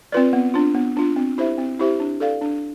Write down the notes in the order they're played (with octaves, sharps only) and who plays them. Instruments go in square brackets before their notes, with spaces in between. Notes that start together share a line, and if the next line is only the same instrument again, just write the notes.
[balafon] C4 F4 B4 D5
B3
D4 F4
B3
D4 F4
C4
E4 G4 C5 E5
C4
E4 G4 C5 E5
D4
A4 D5 F5
D4